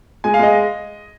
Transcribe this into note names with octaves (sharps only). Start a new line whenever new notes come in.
G#3 G#5
F5
G#3 D#5